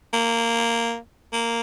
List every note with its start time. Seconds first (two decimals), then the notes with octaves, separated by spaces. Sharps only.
0.13 A#3
1.33 A#3